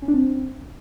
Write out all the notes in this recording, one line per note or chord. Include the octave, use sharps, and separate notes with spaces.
C#4
D4
C4